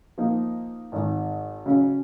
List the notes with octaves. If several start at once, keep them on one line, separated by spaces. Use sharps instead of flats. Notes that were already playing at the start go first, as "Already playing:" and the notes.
F3 A#3 D#4
G#1 G#2 D#3
C#3 F#3 C#4